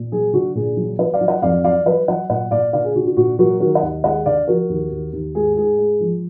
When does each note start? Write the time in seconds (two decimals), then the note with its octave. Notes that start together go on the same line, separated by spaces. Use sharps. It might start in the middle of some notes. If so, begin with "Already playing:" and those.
Already playing: A#2
0.12 F#3 G#4
0.33 D3 F#4
0.55 A#2 G#4
0.77 F#3
0.99 F#3 B4 D#5
1.14 D5 F5
1.21 F#3
1.28 D#5 F#5
1.42 F2 D5 F5
1.64 F#3 D5 F5
1.86 F#3 B4 D#5
2.08 F#3 D#5 F#5
2.30 A#2 D#5 F#5
2.51 A#2 D5 F5
2.73 D3 D5 F5
2.84 G#4
2.95 D3 F#4
3.06 F#4
3.17 A#2 F#4
3.39 F#3 F#4 A#4
3.60 D#3 F#4 A#4
3.75 D#5 F#5
3.82 D#2
4.04 G#3 D#5 F#5
4.26 D3 D5 F5
4.48 F3 F#4 A#4
4.69 D#2
4.91 D#2
5.13 D#2
5.35 G#2 G#4
5.57 G#2 G#4
5.78 G#3
6.00 F3